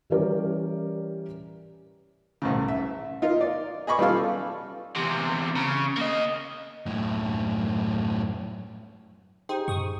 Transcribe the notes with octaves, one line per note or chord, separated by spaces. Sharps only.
E3 G3 C#4 G4 A#4 D5
C2 A2 C#3
E5
D#4 F4 A#4
D5
G#4 D#5 B5 C#6 D6
G3 B3 C#4 F4 A4 F5
E2 C3
C#3
A#3 D#5
F#2 A2
D#4 G4 G#4 C5 G5
F#2 C#6 D#6